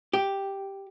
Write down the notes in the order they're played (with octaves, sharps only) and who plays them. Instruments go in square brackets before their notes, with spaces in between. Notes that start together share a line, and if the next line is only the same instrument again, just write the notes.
[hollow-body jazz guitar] G4